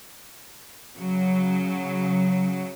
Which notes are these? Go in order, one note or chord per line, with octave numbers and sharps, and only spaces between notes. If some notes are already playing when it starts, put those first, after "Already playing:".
C#3 F#3